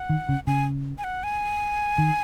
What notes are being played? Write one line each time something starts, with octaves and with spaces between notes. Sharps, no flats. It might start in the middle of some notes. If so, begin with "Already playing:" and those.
Already playing: F#5
D#3
C#3
C#3 G#5
G#5
F#5
G#5
D#3